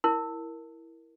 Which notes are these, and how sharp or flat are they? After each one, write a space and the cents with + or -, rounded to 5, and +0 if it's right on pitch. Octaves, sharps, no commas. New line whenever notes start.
E4 +0 A#4 +0